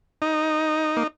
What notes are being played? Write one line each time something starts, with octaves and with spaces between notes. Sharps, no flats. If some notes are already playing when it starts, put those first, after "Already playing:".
D#4
A#3